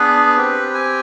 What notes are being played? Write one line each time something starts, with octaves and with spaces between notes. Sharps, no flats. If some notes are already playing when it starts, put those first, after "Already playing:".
Already playing: B3 D4 G#4 B4
C4 G4
G#5